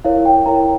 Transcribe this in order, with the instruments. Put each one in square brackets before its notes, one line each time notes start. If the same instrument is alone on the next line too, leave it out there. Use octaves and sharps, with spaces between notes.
[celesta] E4 A#4 C#5 F5
G5
E4 A#4 C#5 A#5